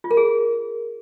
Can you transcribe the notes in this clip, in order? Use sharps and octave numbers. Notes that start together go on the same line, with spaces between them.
F4
A#4
G#4